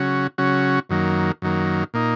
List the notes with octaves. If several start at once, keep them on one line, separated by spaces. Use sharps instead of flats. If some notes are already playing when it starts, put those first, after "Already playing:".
Already playing: C#3 F#3 C#4 F#4
C#3 F#3 C#4 F#4
F#2 D#3 F#3 A#3
F#2 D#3 F#3 A#3
A#2 A#3 D#4